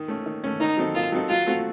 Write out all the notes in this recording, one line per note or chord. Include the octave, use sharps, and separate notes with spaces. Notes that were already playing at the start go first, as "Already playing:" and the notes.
Already playing: D#3
A3 C#4
D#3
A3 C#4
D#3 D#4
F#3 C4 D#4 A4
D#3 F4
F#3 C4 D#4 A4
F#3 F4
A3 C4 F#4 A4